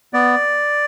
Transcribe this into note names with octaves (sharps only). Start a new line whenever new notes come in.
B3 D5